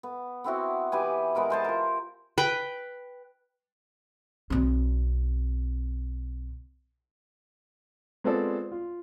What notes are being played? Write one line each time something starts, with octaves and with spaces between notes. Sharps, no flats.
B3
B3 C4 E4 F#4
E3 G4 B4 G#5
G#3 B3 A#4 C5
B4 C5 A5
F4 A#4
B4 G5
B1 C4
G#3 B3 C4 F4 A4 D5
F4